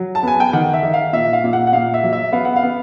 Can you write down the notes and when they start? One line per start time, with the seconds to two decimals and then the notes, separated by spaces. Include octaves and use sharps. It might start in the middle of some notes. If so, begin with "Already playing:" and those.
Already playing: F#3
0.15 A5
0.23 B3 G#5
0.40 G5
0.53 D#3 F#5
0.74 E5
0.83 D#3
0.94 F5
1.13 A#2 E5
1.33 F5
1.44 A#2
1.53 F#5
1.67 F#5
1.73 A#2 F5
1.94 E5
2.04 F#3
2.13 E5
2.32 B3 F5
2.45 F#5
2.56 F5
2.63 B3